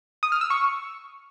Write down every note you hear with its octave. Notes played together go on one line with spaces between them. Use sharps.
D#6
F6
E6
C#6